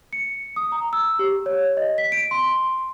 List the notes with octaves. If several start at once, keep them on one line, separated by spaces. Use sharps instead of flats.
C#7
D#6
A#5
E6
G4
C#5
D#5
B6
D7
C6